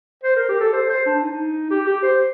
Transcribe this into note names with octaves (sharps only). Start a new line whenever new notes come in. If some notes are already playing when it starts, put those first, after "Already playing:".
C5
A#4
G4
A4
C5
C5
D4
D#4
G4
G4
C5